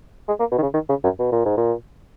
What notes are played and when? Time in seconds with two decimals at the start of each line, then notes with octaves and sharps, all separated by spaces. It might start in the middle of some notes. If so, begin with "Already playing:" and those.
0.28 G#3
0.39 A#3
0.52 B2
0.58 D#3
0.62 C#3
0.74 D#3
0.89 C#3
1.04 F#2
1.19 B2
1.32 A#2
1.45 G#2
1.57 A#2